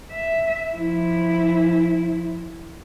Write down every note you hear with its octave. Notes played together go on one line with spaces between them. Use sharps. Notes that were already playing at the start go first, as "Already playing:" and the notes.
E5
F3 E4